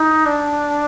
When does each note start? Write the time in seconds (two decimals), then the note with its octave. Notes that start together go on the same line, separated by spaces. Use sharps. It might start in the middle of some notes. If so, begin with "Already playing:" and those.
Already playing: D#4
0.26 D4